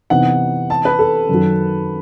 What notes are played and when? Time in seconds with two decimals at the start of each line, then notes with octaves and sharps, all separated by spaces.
0.10 C3 E3 B3 D#4 F#5
0.70 A5
0.85 B4
0.99 A4
1.29 F#2 D#3 F#3